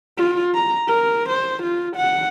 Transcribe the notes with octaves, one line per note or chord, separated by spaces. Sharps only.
F4
A#5
A#4
C5
F4
F#5